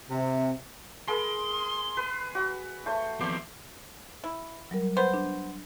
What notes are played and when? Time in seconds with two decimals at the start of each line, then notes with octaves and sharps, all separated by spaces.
0.10 C3
1.08 G#4 A#4 B5 C6
1.97 B4
2.35 F#4
2.86 A3 C5 C#6
3.20 F2 B3 C5 C6 D6
4.24 E4
4.71 F#3 G3 A#4
4.97 B3 C5
5.14 D4